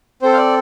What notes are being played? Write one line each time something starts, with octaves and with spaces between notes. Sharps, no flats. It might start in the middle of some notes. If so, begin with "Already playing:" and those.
C4 A4 C5
F5
D5